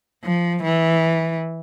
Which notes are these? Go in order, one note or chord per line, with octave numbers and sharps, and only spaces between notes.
F3
E3